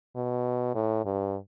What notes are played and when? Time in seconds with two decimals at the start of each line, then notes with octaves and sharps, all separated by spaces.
0.16 B2
0.75 A2
1.05 G2